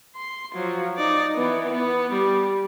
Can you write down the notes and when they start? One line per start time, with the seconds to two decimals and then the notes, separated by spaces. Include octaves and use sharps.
0.16 C6
0.55 F3 F#3
0.97 D#4 D5
1.36 E3 B3
1.73 B3
2.12 G3